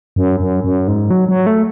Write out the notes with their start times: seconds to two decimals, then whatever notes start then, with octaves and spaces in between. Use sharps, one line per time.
0.16 F#2
0.40 F#2
0.64 F#2
0.88 G#2
1.10 F#3
1.29 F#3
1.46 A3